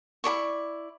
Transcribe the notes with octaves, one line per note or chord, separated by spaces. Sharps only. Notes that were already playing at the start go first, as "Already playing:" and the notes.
E4 G#4 D5 C#6